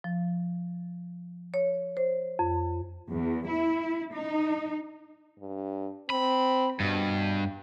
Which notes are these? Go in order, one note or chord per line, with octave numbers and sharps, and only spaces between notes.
F3
C#5
C5
F2
E2
E4
D#4
G2
C4 B5
G2 B2